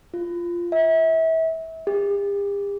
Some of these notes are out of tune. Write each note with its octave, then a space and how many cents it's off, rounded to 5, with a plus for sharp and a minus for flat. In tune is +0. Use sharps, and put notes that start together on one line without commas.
F4 -10
E5 -30
G4 +45